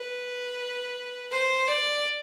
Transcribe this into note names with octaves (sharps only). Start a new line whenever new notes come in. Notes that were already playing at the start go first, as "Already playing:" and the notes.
Already playing: B4
C5
D5